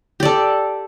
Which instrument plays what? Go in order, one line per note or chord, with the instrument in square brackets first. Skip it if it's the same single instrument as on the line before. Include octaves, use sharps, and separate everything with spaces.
[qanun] G4
D5
A4